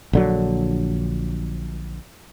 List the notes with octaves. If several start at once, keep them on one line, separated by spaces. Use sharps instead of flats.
A#1 D3 F#3